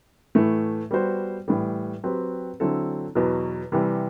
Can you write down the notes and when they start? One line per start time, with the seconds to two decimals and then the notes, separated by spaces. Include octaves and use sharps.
0.35 A2 E3 A3
0.91 G3 B3 F#4 C5
1.48 A2 E3 G3
2.03 F#3 C4 G4 B4
2.60 D3 F#3 C4 E4 A4
3.15 E2 B2 F#3
3.72 C3 E3 G3